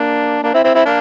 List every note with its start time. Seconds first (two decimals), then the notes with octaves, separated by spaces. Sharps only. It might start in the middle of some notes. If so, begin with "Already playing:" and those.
Already playing: A#3 D4
0.43 A#3 D4
0.54 C4 E4
0.64 C4 E4
0.74 C4 E4
0.85 A#3 D4